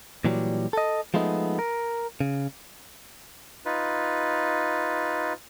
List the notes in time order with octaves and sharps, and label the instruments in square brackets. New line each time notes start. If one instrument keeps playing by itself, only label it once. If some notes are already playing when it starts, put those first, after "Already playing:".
[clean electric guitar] A#2 E3 F#3 G3
A4 D#5
F3 G#3 A3 B3 D#4
A#4
C#3
[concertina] D#4 F4 B4